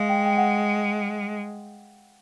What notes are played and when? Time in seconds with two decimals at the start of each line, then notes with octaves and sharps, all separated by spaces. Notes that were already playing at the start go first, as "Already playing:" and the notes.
Already playing: G#3 F5
0.09 G5
0.26 G5
0.37 F#5